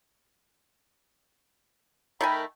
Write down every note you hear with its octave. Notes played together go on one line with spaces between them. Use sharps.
D#3 A3 A#4 G5 G#5 B5